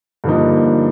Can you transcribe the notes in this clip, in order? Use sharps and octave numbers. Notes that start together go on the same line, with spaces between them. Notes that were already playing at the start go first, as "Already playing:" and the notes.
G2 D3 F3 A#3 D#4